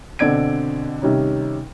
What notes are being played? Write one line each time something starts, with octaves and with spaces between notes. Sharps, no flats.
B2 D3 C4 D5 G#6 D7
C3 D#3 G3 C#4 D#4